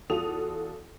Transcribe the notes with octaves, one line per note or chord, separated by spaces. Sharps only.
E2 F4 F#4 A4 D#6 F7